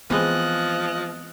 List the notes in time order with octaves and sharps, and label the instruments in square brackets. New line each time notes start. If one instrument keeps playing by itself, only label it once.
[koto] E3 G#3 C4 [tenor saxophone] F3 [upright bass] B3 [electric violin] D#5 F#6